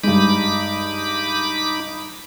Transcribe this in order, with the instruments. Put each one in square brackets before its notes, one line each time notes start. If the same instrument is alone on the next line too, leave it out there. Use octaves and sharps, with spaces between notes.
[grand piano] G2 G#3 [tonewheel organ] D#4 B5 D6